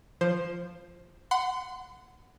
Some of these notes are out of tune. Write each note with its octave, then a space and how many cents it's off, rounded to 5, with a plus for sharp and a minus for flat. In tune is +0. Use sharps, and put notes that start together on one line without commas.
F3 +0 C5 +10
F#5 +0 C6 -35